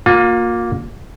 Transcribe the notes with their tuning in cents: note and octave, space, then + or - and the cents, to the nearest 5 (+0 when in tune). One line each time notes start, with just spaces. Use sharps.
A#3 +0 F4 +35